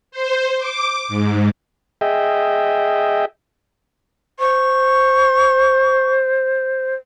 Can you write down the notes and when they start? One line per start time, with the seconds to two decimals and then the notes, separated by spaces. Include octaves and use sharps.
0.11 C5
0.59 D6
1.08 G#2
2.01 G#4 D#5 E5 G5
4.39 C5 C#6